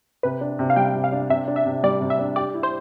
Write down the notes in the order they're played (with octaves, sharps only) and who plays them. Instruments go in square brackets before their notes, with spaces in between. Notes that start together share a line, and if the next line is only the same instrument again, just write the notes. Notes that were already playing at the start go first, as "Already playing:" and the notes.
[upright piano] C3 [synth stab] B4
[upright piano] D4
C3
[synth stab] F5
[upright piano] G3 [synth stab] G5
[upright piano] C3
[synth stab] F5
[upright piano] D4
[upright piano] C3 [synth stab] E5
[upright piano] D4
[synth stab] E5
[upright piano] C3
[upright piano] G3 [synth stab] D5
[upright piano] C3
[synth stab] E5
[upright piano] D4
[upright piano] G4 [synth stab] D5
[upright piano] E4
[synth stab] C5